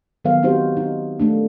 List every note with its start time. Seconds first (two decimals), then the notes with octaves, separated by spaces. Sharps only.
0.25 D#3 F#3 B3 A#4 C5 F5
0.43 C4 D#4 F#4 G4 C5
0.77 D#4
1.20 A3 A#3 D4